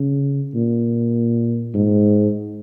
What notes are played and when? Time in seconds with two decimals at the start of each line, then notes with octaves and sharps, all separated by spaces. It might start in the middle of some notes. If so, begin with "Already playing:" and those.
Already playing: C#3
0.55 A#2
1.74 G#2